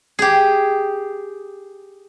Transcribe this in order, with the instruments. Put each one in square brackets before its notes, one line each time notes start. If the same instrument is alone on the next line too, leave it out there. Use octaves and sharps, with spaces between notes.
[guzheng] G4 G#4